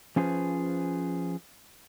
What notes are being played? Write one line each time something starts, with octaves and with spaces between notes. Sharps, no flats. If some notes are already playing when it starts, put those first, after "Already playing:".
F3 C#4 F4 G#4 B4 C5